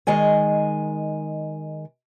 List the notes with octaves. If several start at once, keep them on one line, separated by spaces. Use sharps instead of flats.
D#3 G#3 D#5 G#5